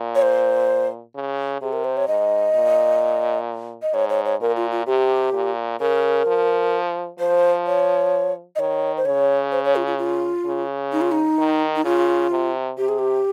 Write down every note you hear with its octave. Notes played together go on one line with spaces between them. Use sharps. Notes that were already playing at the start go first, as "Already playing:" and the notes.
Already playing: A#2
C#5
C5
C#3
C3 G#4
A#4
C5
C#5
G#2 D#5
A#2
D#5
G#2 C#5
C#5
C#5
A#2 A#4
F4
F4
C3 G4
A#2
C#3 A#4
F3
F3 C5
C#5
D#5
D#3 C#5
C5
C#3 C#5
C5
C#5
F4
F4
F4
C#3
D#4
F4
D#4
D#3
D#4
C#3 F4
C3
C3 G4
G#4
G4